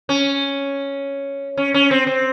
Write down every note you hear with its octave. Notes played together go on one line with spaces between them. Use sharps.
C#4
C#4
C#4
C4
C4